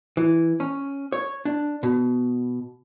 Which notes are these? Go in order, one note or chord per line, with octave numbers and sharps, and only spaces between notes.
E3
C#4
C#5
D4
B2